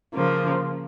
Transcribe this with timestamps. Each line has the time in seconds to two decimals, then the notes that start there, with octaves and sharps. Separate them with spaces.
0.14 C#3 F3 A#3